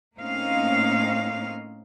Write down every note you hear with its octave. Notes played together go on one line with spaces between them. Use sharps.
A2 A#3 C4 C#4 D#4 F5